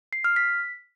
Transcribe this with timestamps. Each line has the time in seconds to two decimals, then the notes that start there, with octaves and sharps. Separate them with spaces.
0.13 C7
0.24 F6
0.36 B6